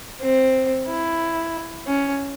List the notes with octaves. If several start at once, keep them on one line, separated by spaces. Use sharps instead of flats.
C4
E4
C#4